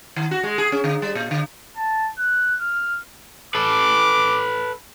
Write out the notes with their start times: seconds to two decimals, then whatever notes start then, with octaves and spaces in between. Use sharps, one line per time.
0.16 D#3
0.31 F#4
0.43 G#3
0.58 G#4
0.72 C#4
0.84 D3
1.02 G3
1.15 A#2
1.31 D3
1.77 A5
2.18 F#6
2.61 F6
3.55 A4 B4 D6